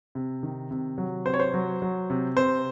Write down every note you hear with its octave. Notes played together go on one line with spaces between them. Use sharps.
C3
D#3
C3
F#3
C3 C5
C#5
C5
F#3
F#3
C3
C3 C5